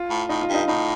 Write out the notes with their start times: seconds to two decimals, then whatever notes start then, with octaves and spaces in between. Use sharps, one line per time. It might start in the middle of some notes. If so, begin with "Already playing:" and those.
Already playing: F4
0.10 A2
0.29 A2 D#4
0.42 F4
0.49 G2
0.54 D#4
0.68 A2 D#4